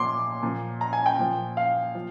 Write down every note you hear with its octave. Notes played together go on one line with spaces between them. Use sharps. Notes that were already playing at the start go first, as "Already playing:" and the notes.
Already playing: A#2 F3 C6 D6
A#2 F3
A#5
G#5
G5
A#2 F3
F5
F3